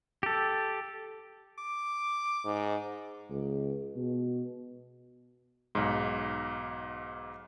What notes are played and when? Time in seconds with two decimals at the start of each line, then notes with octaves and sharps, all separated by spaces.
0.23 G4 A4
1.58 D6
2.45 G#2
3.30 C#2
3.96 B2
5.75 B1 G#2